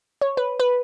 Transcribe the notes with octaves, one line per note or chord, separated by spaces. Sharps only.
C#5
B4
B4